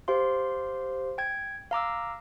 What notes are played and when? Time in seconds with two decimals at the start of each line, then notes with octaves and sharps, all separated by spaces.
0.08 G4 C5 F5 C6
1.18 G5 G#6
1.71 F5 A#5 D6 E6